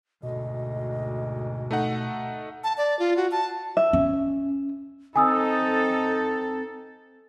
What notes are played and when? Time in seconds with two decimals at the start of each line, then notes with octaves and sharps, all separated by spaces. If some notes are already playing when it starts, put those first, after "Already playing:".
0.23 D2 G#2 B2 D#5
1.71 A3 D#4 F#5
2.64 A5
2.77 D5
2.99 F4
3.17 F#4
3.31 A5
3.77 E5
3.93 C#4
5.16 C4 D#4 A4 G#5 D#6 E6